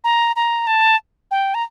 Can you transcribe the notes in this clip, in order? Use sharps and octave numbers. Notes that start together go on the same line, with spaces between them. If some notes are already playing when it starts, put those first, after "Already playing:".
A#5
A#5
A5
G5
A#5